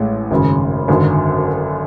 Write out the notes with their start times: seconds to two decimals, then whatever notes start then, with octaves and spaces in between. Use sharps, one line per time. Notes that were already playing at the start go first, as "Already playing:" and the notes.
Already playing: A1 A2 G#3
0.31 G#1 F#2 C#3
0.88 G#1 F#2 D3 F#3